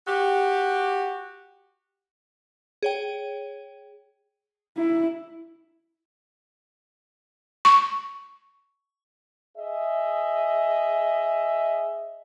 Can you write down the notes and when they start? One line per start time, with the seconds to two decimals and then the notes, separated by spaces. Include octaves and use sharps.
0.07 F#4 G4
2.83 G#4 C#5 G5
4.77 E4
7.65 C#6
9.58 G#4 D#5 E5